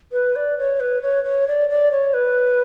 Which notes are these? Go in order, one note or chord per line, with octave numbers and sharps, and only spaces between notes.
B4
D5
C#5
B4
C#5
C#5
D5
D5
C#5
B4